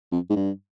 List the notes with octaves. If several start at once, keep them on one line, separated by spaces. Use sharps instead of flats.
F2
G#2
G2